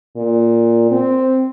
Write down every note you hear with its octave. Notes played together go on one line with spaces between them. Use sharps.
A#2
C4